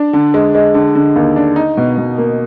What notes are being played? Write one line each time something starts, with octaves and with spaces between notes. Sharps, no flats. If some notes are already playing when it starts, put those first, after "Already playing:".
Already playing: D4
D3
G#3
G#3
D3
D3
D#2
D4
D#4
B2
B2
A#3